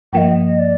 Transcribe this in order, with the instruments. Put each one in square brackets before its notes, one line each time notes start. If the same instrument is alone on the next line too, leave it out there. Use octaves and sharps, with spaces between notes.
[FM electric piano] G2 F3 A#3 [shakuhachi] D#5 G5
[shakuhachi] D5